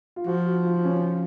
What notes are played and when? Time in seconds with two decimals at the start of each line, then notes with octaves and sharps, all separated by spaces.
0.16 F4
0.26 F3 F#4
0.46 F#4
0.65 F4
0.84 C#4